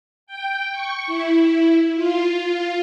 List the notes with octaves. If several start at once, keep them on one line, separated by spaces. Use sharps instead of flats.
G5
C#6
E4
F4